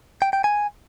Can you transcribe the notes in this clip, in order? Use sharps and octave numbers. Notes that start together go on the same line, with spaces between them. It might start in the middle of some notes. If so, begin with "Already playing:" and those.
G5
G5
G#5